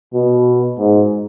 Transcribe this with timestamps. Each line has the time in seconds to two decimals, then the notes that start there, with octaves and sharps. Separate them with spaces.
0.14 B2
0.78 G#2